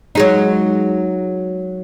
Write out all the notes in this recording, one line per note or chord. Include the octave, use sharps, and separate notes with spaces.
F#3 G#3 D#4